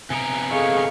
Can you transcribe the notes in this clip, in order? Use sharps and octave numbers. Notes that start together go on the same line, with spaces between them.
C3 B3 G#5 A#5 C#7 D7
G#4 A4 D#5 F5 C#6